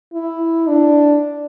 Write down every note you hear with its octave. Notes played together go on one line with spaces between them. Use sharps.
E4
D4